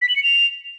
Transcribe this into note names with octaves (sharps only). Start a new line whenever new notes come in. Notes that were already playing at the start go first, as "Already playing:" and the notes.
B6
F#7
C#7
F7